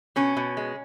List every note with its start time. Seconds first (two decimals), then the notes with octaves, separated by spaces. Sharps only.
0.16 B2 C#4
0.37 B2
0.57 G#3